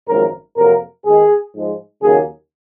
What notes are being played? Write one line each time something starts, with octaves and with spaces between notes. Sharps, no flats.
G#1 F#2 F3 G#3 A#4
F2 C3 F#3 A#3 A#4
D#2 D#3 G#3 G#4
G#2 F3 G#3
D#2 C#3 F#3 A#3 G#4